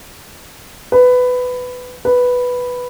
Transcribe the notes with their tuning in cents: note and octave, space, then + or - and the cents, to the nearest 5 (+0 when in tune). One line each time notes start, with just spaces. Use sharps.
B4 +15
B4 +0